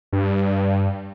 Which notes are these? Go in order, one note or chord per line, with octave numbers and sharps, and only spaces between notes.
G2